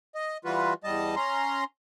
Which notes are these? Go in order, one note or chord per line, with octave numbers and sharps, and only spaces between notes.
D#5
E3 G3 F4 F#4 B4
E2 G3 D#5 A5
C#4 A#5 C6